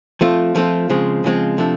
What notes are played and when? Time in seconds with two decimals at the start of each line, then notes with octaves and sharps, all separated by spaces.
0.21 F3 A3 C4 F4
0.55 F3 A3 C4 F4
0.90 C#3 F3 G#3 C4
1.24 C#3 F3 G#3 C4
1.58 C3 F3 A3 D4